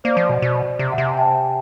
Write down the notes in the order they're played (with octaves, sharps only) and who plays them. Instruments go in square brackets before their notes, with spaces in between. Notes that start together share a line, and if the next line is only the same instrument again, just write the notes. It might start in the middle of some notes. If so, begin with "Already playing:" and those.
[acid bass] A#3 [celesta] C5 D5
[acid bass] F3
B2
B2
C3
[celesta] E5 F#5
[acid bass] C3
[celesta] F#5 G#5
G5 A5